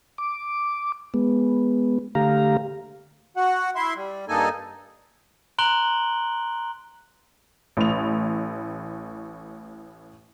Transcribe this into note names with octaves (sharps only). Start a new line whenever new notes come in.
D6
G#3 B3
D3 A3 G4 F5 A#5
F#4 F#5
E4 E5 C6
G3
G2 A#3 D#4 A4 G#5
A#5 C6 F#6 D7 F#7 G7
A1 A2 F7